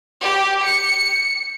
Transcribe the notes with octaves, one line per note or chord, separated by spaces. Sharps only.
G4
C#7